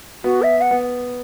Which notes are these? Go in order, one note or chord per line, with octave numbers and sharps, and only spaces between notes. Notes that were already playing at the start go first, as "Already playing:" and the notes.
B3 F#4
E5
F#5
B3